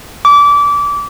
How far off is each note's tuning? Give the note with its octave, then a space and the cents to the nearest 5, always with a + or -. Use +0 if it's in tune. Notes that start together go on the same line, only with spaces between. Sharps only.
D6 -25